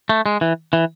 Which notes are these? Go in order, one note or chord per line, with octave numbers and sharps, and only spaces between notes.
A3
G#3
E3
E3